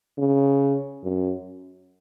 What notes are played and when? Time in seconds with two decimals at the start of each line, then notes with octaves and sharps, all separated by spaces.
0.18 C#3
1.03 F#2